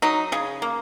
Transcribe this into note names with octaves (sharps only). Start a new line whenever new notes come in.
F#3 D#4
C#3 G#4
A#3